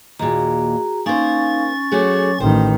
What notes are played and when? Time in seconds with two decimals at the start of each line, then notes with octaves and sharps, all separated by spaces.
0.19 D#2 A#2 F#4 G#4 A#5
1.06 A#3 C#4 D#4 C5 F5 G#5 C#6 A6
1.92 F#3 A3 F#4 G#4 C#5 D6
2.40 A1 D#3 C5 G5